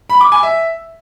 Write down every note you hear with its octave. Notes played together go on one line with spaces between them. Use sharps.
B5
D6
G#5
E5